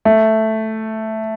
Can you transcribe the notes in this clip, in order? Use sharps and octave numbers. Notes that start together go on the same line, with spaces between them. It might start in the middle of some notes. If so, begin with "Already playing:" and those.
A3